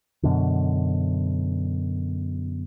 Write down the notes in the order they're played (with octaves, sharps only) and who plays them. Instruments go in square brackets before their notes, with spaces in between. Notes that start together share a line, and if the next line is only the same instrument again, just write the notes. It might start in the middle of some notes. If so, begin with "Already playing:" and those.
[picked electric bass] F#2 B2 D3